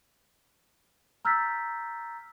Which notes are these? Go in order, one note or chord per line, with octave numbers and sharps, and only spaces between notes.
A#5 E6 F6 G6 A6 B6